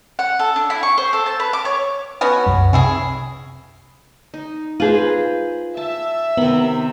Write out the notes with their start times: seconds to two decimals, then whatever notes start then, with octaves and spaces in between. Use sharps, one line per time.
0.19 F#5
0.39 A4
0.56 D4
0.70 E4
0.83 C#6
0.98 C5
1.13 A4
1.26 A5
1.40 B4
1.53 D6
1.65 C#5
2.21 B3 C#4 F#4
2.47 C2 F#2
2.73 C3 C#4 E4 G#4
4.34 D#4
4.80 F4 G#4 B4 C5 A#5
5.77 E5 A5
6.37 C3 D#3 B3 B5